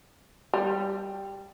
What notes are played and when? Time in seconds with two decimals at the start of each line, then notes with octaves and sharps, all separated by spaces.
0.53 G3